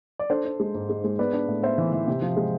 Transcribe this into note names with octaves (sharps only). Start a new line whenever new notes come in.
D5
D4 A4 C5
D4
G#3
G#2
G#3
G#3
B3 B4 D5
D4
A2
B3 C5 E5
E3
E3
C3
F3
G#3